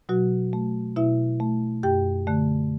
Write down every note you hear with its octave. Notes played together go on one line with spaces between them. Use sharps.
B2 F#3 F#4
A3
B2 E4 E5
A3
F#2 G4 G5
D3 A3